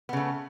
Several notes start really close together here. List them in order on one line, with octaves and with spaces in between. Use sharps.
B3 C#3 A3